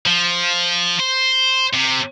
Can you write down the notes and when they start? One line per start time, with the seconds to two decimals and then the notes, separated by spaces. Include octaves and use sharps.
0.06 F3
1.00 C5
1.73 C3